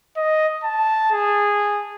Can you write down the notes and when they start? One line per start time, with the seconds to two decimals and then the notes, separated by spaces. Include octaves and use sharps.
0.17 D#5
0.64 A5
1.12 G#4